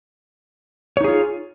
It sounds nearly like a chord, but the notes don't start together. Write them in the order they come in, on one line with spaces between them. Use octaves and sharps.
C#5 D#4 G#4 F4